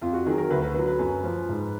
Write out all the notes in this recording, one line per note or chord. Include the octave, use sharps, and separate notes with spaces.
F2 F4
F#4
D#3 F#3 G#4
A#4
D2 B4
B4
D3 F#3 B4
B4
F#2
F3
G#2